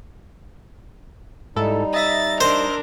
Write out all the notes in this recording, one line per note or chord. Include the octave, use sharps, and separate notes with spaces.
G#2 G3 D#4 E4 A4
D#5 E5 A6 A#6
D4 A#4 C5